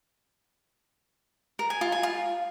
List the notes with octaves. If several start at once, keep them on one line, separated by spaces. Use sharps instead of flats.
A#4
G#5
F4
G#5
F4